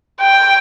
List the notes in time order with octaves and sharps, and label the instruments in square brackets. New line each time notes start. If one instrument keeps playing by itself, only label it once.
[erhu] G5